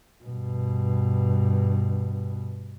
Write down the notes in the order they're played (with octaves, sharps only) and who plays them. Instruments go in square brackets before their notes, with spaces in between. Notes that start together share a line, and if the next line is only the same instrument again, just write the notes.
[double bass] G2 B2